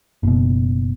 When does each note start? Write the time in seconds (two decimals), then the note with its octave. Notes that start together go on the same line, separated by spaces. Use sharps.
0.23 F#1 B2